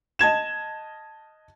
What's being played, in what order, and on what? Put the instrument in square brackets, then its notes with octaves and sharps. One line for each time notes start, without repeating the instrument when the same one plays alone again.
[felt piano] D#5 A5 G#6 E7